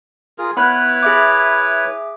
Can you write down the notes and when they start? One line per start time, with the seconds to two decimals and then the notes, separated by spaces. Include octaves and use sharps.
0.38 F4 G#4 A#4
0.57 B3 E4 B4 C#5 B5 F#6
1.03 G#4 E5 D6